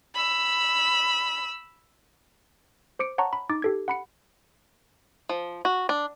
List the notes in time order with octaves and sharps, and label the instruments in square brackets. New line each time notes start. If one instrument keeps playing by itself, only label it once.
[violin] B5 E6
[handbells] C5 D6 C#7 D7
C#5 F#5 A5 A#5 C#6
B5
D#4 D6 A6
G4 A4 G#6
F#5 B5 C#7
[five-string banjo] F3
F#4
D4